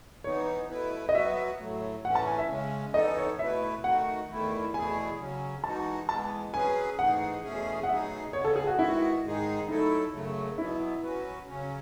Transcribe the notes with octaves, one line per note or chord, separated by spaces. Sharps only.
E3 B3 D#4 C#5
B2 A3 E4 B4
D#5
F#3 B3 F#4 B4 E5
A2 F#3 A3
A2 E3 A3 C#4 F#5
A5
G#5
E5
C#3 G#3 C#4
E3 B3 D#4 A4 D#5
C#5
B2 A3 E4 B4 E5
D#3 A3 D#4 F#4 F#5
E2 D#3 A3 E4
E2 B2 A3 E4 G#4 G#5
C#3 F#3 C#4
E3 G#3 D#4 F#4 A5
E3 G#3 B3 A5
F#3 C#4 G#4 B4 G#5
G#2 E3 A3 D#4 G#4 F#5
E2 B2 A3 C#4 G#4
F#5
B2 F#3 A3 D#4 G#4 E5
C#3 G#3 B3 C#5
A4
G#4
F#4
D#3 G#3 B3 E4 F#4
G#2 D#3 G#3 D#4 G#4
F#3 A3 D#4 E4 A4
F#2 C#3 F#3 A3
B2 F#3 B3 E4
F#3 C#4 F#4 B4
C#3 F#3 C#4